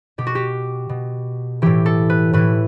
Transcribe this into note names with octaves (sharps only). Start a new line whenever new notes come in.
B2 G4
F#4
G4
B2
A2 E3 G4
A4
B4
A2 E3 B4